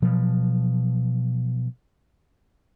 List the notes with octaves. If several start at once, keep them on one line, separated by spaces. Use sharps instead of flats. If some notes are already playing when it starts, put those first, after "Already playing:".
B2 F3 F#3